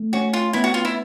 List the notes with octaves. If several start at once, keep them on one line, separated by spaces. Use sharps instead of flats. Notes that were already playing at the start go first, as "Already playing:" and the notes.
Already playing: A3
C#4 F#4
F4
B3 E4
F#4
F4
E4